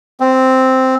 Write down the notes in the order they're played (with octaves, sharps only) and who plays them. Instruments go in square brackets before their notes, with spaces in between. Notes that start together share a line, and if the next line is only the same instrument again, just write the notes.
[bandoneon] C4